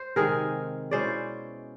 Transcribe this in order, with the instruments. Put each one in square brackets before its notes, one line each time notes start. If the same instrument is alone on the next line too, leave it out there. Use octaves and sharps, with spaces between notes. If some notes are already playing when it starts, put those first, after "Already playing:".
Already playing: [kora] C5
C3 D#3 G#3 C4 G#4 A#4
B2 G#3 C#4 E4 C5 D5